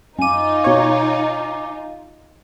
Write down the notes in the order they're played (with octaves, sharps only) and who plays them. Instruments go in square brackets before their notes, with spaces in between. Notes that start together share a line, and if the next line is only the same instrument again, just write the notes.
[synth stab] F#2 D#7 [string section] D#4 F4 [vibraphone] G#5 D6
[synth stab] B2 C#5